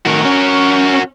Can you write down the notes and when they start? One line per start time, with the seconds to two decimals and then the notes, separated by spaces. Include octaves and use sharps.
0.06 A2 D#3 F#4 A#4
0.25 C#4